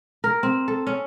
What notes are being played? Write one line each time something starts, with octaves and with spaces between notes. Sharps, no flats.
A#4
C4
A4
C#4